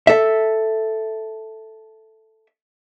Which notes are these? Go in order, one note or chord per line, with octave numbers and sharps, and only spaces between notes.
A4 E5